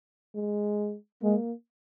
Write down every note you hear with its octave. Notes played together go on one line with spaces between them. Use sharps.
G#3
G#3 A#3